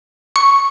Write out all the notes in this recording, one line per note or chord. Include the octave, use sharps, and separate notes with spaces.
C#6